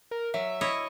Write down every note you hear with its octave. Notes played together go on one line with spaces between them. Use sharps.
A#4
F#3 E5
E4 C#5 D#5